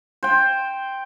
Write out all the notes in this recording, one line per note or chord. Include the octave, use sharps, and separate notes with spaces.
C5 G5